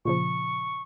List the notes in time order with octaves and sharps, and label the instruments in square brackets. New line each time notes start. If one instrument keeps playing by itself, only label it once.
[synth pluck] A#2 C#3 F3 [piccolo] C#6